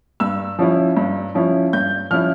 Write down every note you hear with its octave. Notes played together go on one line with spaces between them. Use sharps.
G2 E6
F3 C#4 E4
G2
F3 C#4 E4
G2 G6
F3 C#4 E4 F6